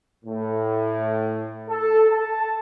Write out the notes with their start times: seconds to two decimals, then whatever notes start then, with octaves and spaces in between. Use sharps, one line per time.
0.25 A2
1.69 A4
2.09 A5